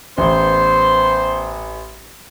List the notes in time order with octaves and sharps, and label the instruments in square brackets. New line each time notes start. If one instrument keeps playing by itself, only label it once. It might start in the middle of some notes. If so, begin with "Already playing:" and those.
[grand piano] A1 [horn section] B3 C5